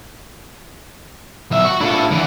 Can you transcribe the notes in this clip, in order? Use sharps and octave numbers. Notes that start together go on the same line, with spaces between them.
B1 E5
F#4
D4 E4 F4 A4
D3 E3 B3